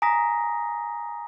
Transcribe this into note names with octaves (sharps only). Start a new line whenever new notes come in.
G#5 A#5 D#6 A#6 B6